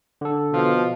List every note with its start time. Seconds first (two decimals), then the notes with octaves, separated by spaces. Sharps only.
0.21 D3 A4
0.54 B2 F3